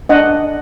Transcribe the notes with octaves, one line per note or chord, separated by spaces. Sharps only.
D4 D#5 F#5